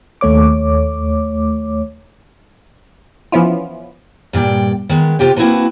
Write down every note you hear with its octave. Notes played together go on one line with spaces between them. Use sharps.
D#2 A3 C#5 D6
E3 F3 B3 C#4 E4 F4
G2 A#2 D5 G5
D#3 G#3 B3
C3 F4 G4 G5
A#3 C4 E4 F#4 B4 A5